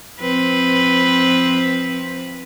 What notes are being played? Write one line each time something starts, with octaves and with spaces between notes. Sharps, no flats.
F3 C4 B4